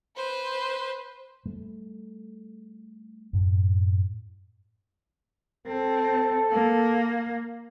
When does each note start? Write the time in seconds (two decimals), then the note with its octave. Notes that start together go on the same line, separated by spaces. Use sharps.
0.17 B4 C5
1.46 G3 A3
3.33 F#2 A2
5.67 C4 A4
6.51 A#3